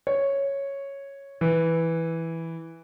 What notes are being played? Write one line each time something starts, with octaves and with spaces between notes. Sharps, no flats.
C#5
E3